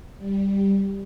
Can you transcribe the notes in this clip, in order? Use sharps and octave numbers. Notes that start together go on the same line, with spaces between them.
G3